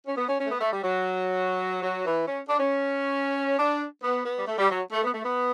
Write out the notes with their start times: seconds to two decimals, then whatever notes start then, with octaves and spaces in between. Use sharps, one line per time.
0.07 C#4
0.17 B3
0.28 C#4
0.39 C#4
0.45 A3
0.50 B3
0.61 A3
0.72 G3
0.83 F#3
1.83 F#3
2.05 E3
2.27 C#4
2.49 D4
2.59 C#4
3.59 D4
4.03 B3
4.25 B3
4.38 G3
4.47 A3
4.58 G3
4.70 F#3
4.92 A3
5.03 B3
5.14 A3
5.24 B3